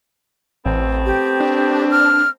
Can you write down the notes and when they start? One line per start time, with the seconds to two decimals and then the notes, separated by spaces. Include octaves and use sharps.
0.66 A1 A3 B3 C4
1.06 G4
1.40 D4
1.91 F6